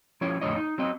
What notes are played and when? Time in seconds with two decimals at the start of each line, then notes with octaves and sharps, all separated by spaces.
0.21 F3 C#4 E4 C#5
0.41 F2 A2 D3 G#3 C#5 D#5
0.56 D#4
0.78 F#3 C4 D#5